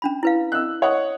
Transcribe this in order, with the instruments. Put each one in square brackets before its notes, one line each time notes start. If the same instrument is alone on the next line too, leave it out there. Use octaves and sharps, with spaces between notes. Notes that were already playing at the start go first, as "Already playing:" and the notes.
[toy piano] C#4 D4 B5
E4 B4 F5
[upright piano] E6 F#6
C#5 D#5 F#5